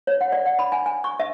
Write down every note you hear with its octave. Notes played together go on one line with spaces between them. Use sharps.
C#5
F#5
D5
F#5
B5
G#5
G#5
C#6
E5